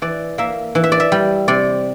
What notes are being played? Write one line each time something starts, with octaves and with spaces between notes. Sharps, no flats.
E3 D5
A#3 E5
E3
E5
D5
E5
G3
C3 D5